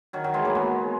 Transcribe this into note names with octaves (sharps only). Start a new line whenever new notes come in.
D#3 F#3
D#3 F#3
E3 G#3
F#3 A#3
G#3 B3